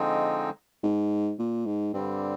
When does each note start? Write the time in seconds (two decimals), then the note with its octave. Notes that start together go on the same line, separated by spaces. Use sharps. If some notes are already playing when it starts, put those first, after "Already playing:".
Already playing: D3 F3 G#3 C4 D#4
0.83 G#2
1.39 A#2
1.67 G#2
1.94 G2 D3 G3 C4